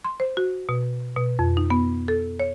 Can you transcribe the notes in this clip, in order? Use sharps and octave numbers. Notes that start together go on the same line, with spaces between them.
C6
C5
F#4
B2
B2
F2
D#4
B3
A4
C#5